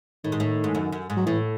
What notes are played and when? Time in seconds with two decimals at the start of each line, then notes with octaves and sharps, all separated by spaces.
0.24 A2 D#3
0.32 G#2
0.40 A2
0.64 G#2
0.75 F#2
0.92 F#2
1.10 G#2
1.17 F#3
1.26 A2 E3